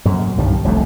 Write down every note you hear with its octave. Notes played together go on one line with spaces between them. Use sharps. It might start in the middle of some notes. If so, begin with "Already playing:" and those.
F#2 A#2
C2 G2 D#3 G3
F1 C2 F#2 A3